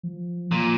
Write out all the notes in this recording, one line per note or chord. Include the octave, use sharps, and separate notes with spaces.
F3
A#2 F3